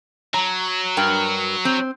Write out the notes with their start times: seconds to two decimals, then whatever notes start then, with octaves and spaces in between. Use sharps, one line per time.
0.34 F#3 A#5
0.97 G2 A#4 G5
1.65 C4